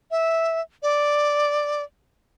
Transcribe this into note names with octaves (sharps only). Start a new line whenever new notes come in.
E5
D5